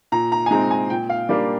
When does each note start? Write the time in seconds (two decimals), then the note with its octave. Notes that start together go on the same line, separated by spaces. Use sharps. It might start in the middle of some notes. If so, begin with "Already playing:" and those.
0.12 A#2 A#5
0.32 A#5
0.46 G#5
0.51 G#3 C4 D#4 A#5
0.71 G#5
0.90 A#2 G5
1.10 F5
1.29 G3 A#3 D4 D5